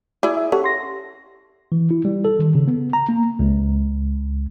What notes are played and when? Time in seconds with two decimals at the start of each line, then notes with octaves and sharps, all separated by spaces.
0.23 E4 G#4 D5
0.37 E5
0.52 C#4 G4 A4 F#5
0.64 C6 A#6
1.72 E3
1.91 E4
2.05 G3
2.25 A4
2.39 D#3
2.55 C#3
2.68 B3
2.93 A#5
3.09 A#3
3.39 C#2